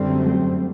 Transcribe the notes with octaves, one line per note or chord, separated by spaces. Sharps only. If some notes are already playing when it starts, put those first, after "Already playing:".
Already playing: F#2 D3 G3 A3 C4
F#3
G3